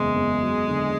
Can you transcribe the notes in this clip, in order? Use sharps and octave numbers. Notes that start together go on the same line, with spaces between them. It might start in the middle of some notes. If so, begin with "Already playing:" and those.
Already playing: F#1 E2 G#3
E2
F#3
D3